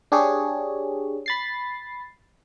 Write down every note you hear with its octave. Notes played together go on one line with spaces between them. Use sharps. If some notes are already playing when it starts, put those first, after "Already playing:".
D4 G4 G#4 C#5
B5 A6 C7